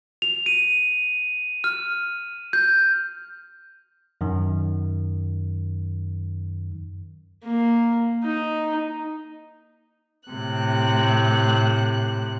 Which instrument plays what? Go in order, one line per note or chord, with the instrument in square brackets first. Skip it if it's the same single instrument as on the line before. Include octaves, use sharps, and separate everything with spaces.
[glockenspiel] F7
D#7
F6
G6
[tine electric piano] F#2 D#3
[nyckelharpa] A#3
D#4
[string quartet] A2 C3 F#6